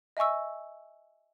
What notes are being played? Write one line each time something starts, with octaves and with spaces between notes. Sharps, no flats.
D#5 E5 G#5 C#6 E6